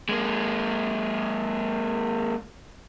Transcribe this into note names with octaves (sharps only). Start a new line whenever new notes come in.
G#3 A#3